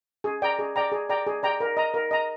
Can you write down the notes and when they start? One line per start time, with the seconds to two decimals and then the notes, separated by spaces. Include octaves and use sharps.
0.24 G#4
0.42 D5 G5 A#5
0.59 G#4
0.76 D5 G5 A#5
0.92 G#4
1.09 D5 G5 A#5
1.27 G#4
1.43 D5 G5 A#5
1.60 A#4
1.77 D#5 A#5
1.94 A#4
2.11 D#5 A#5